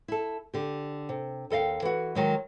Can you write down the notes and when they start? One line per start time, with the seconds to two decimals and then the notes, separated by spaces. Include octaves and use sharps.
0.08 E4 A4
0.54 D3 G4
1.09 C3
1.50 D#2 A4 D#5 F5 G5
1.82 E3 F#4
2.15 D#3 F#3 G#3